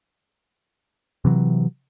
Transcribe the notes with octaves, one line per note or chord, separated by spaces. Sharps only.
C3 E3 F#3